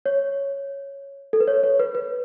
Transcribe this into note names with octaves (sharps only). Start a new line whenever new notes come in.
C#5
A4
B4
C#5
C#5
B4
B4